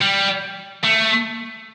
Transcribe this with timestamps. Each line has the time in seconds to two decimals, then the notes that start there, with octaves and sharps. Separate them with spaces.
0.02 G3
0.85 A3